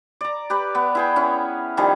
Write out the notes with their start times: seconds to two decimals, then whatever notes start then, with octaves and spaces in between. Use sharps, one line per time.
0.21 D5 A#5
0.50 G4 B4 D5
0.75 B3
0.95 E4 G#4 G5
1.16 C#4 E4
1.77 D#3 F3 G3 G#4